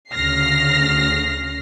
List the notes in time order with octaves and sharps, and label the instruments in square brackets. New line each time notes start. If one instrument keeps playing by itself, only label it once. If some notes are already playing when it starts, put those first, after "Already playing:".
[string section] D2 C#3 F6 A#6 C7